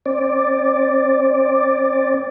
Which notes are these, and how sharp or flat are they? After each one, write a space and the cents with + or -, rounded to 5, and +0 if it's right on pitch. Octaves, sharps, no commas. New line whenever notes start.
C4 +35 D5 +0